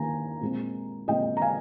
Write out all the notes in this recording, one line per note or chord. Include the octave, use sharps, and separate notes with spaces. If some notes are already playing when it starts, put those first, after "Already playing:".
Already playing: D#3 A#3 G#5 A#5
A#2 G#3 C4
A#2 G#3 C4 D#5 G5
A#5
F5 G#5